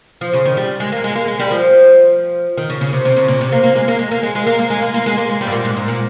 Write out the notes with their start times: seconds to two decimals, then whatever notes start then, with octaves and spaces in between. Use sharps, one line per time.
0.21 F3
0.33 C#3
0.45 D#3
0.57 G3
0.80 G#3
0.92 A#3
1.04 G#3
1.15 A#3
1.28 G#3
1.39 G3
1.51 F3
2.57 D#3
2.70 C#3
2.81 C#3
2.93 C3
3.05 C3
3.17 C#3
3.28 A#2
3.41 C3
3.52 A#3
3.63 A#3
3.75 G#3
3.88 A#3
3.99 G#3
4.11 A#3
4.23 G#3
4.35 G#3
4.47 A#3
4.59 A#3
4.70 G#3
4.82 A#3
4.94 A#3
5.06 G#3
5.17 A#3
5.29 G#3
5.41 G3
5.47 G#2
5.52 A#2
5.65 G#2
5.76 G#2
5.88 A#2